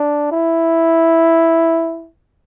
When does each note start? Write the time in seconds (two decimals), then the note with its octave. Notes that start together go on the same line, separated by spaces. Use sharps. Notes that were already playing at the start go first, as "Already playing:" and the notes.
Already playing: D4
0.31 E4